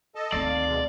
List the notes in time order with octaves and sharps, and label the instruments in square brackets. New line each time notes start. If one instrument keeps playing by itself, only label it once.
[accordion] A4 D#5 A5
[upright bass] D2 D#3 [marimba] A3 C4 [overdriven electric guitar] D5
[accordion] F5
B2 G#3